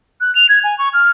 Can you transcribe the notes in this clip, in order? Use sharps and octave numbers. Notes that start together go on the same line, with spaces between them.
F#6
F7
G#6
G#5
C#6
F6